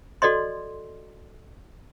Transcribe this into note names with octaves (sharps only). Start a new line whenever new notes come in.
F#4 A4 D5 D#5 C6